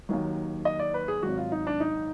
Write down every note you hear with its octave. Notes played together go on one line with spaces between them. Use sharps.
D#2 D#3 F#3
D#5
D5
B4
G#4
G#1 G#2 F#3 F#4
F4
D#4
D4
D#4